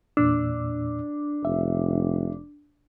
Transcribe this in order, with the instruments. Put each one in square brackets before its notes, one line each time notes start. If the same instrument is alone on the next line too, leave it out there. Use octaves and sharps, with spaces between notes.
[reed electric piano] E2 A#2 E6 [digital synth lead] D4
[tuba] F1 [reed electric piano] E5